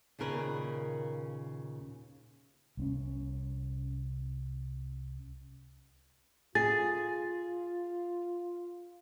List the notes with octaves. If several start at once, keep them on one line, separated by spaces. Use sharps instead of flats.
D#2 A#2 C#3 A#4 B4
C2 C4 C#4
F4 G#4 A6